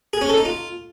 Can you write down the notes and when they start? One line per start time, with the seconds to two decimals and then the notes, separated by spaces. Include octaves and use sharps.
0.13 G#4
0.21 C#4
0.29 A4
0.37 D#4
0.45 F4